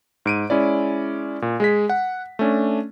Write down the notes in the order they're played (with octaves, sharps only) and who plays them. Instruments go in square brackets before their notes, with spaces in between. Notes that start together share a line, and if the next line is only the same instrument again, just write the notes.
[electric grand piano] G#2 D7 D#7
G#3 C#4 E4 D5
A#2
G#3 G#4 B6
F#5
A3 C#4 D4